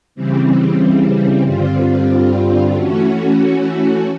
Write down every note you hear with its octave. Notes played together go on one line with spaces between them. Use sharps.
C#3 E3 G3 C4
G2 D3 G3 C4 F4
E3 A3 C#4 F#4